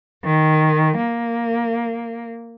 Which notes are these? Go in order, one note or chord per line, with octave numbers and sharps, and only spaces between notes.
D#3
A#3